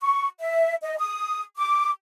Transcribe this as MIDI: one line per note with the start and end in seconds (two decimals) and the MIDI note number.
0.01 0.27 85
0.40 0.75 76
0.83 0.98 75
0.98 1.42 87
1.57 1.89 86